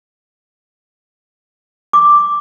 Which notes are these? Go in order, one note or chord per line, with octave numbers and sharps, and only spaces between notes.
D6